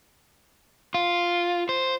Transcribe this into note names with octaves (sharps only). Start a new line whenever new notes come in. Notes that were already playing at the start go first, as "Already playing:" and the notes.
F4
C5